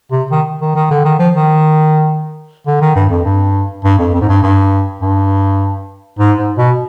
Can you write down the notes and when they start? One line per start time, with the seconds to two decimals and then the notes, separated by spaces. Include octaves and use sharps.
0.12 C3
0.31 D#3
0.61 D#3
0.75 D#3
0.91 D3
1.05 D#3
1.19 F3
1.35 D#3
2.67 D3
2.81 D#3
2.96 G2
3.10 F2
3.25 G2
3.85 G2
3.99 F2
4.14 F2
4.21 G#2
4.29 G2
4.43 G2
5.01 G2
6.19 G#2
6.38 G#2
6.58 B2